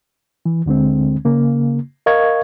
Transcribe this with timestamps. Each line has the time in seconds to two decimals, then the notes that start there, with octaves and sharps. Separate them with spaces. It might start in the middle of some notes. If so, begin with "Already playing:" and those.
0.46 E3
0.66 D2 D3 G#3 C4
1.25 C#3 A#3
2.06 A#4 D#5 F5 C#6 G#6